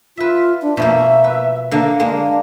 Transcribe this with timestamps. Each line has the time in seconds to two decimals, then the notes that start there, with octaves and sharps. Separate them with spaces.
0.17 F4 B4 E5
0.62 D4
0.77 B2 F3 A#3 E5
1.24 B4
1.71 D3 A#3 A5
2.00 G#3 A#3 D4